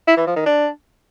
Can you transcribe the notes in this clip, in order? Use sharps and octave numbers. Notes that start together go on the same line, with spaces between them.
E4
E3
F3
D#3
D4